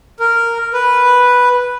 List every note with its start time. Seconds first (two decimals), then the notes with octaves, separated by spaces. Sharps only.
0.20 A#4
0.73 B4